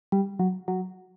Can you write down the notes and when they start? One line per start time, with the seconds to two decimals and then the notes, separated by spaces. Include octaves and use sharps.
0.12 G3
0.39 F#3
0.68 F#3